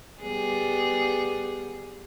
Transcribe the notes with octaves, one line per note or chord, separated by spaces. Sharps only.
G3 B3 G#4